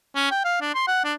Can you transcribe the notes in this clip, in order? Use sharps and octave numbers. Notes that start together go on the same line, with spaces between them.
C#4
G5
F5
D4
C6
F#5
D4